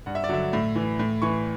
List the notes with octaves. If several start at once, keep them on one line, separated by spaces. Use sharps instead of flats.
G2 F#5
E5
D5
D3 F#3 E5
A2
E3
A2
E3 C#6